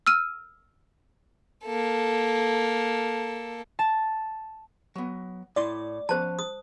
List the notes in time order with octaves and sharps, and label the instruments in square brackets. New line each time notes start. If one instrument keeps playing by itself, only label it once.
[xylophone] E6 F6 D#7
[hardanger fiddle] A#3 A4
[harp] A5
[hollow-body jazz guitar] F#3 B3
[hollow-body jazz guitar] A2 E4 C6 [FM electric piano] D5
[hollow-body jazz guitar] F3 B3 C#4 [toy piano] C5 A5
[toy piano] D#6